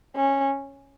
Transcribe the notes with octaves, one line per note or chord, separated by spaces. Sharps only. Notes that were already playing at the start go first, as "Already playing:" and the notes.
C#4